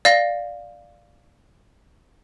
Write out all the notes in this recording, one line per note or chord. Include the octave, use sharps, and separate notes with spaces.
D5 F5 A#6